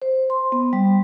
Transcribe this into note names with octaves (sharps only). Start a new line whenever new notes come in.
C5
C6
B3
G3